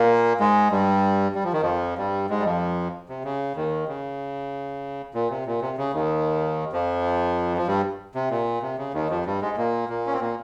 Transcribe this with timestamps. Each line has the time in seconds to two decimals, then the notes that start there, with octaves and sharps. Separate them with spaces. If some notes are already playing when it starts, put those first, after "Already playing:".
Already playing: A#2 A#3
0.40 G#2 G#3
0.71 G2 G3
1.35 G3
1.44 F3
1.53 D#3
1.61 F2 F3
1.98 G2 G3
2.30 G#2 G#3
2.40 G3
2.45 F2 F3
3.09 C3
3.24 C#3
3.56 D#2 D#3
3.88 C#3
5.14 A#2
5.30 C3
5.46 A#2
5.61 C3
5.77 C#3
5.93 D#2 D#3
6.72 F2 F3
7.57 F3
7.67 G2 G3
8.15 C3
8.31 A#2
8.62 C3
8.78 C#3
8.94 D#2 D#3
9.10 F2 F3
9.26 G2 G3
9.42 G#2 G#3
9.57 A#2 A#3
9.89 A#2 A#3
10.07 C#4
10.13 C4
10.21 A#2 A#3